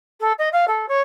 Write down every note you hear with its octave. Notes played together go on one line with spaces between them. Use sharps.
A4
D#5
F5
A4
C#5